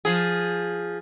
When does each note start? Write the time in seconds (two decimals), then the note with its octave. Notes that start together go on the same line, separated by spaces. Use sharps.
0.05 F3 G#4